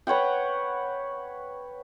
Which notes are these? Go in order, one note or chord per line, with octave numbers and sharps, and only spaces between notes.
B4 C#5 F#5 G5